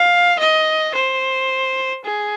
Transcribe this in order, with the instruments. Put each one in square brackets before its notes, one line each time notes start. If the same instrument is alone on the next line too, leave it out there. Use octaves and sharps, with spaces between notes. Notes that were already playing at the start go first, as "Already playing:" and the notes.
Already playing: [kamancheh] F5
D#5
C5
G#4